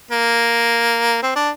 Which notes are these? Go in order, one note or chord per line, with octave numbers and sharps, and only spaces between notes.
A#3
C4
D4